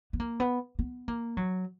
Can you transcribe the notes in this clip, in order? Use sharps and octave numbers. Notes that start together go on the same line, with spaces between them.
B3
A#3
B3
B3
A#3
F#3